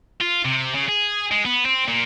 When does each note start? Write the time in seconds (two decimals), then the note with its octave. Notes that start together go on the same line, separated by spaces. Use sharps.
0.21 F4
0.45 C3
0.74 C#3
0.88 G#4
1.31 G#3
1.45 B3
1.65 C4
1.89 A#2